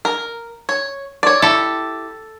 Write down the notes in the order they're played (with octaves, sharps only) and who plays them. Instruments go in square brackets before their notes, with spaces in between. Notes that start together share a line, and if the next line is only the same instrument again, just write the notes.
[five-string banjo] A#4
C#5
C#5 D5
[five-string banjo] E4 G4 [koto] A4